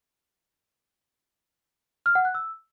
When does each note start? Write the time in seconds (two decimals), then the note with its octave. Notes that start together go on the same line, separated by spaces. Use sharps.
2.06 F6
2.15 F#5
2.25 F#6
2.35 E6